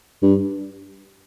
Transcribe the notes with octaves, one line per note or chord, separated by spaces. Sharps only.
G2